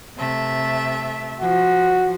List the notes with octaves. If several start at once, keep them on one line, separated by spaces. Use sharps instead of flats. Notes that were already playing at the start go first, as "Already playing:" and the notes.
C3 A3 E5
F3 F#4